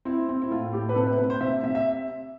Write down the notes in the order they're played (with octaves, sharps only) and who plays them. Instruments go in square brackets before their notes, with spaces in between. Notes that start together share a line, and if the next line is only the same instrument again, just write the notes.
[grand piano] C4 E4
C4
E4
A2 F4
A2 G4
B4
C3 A4
B4
C3 B4
C5
C3 E5
C3 E5
E5